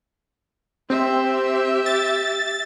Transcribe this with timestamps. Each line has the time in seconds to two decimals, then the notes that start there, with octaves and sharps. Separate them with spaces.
0.90 C4 G4 E5
1.86 A6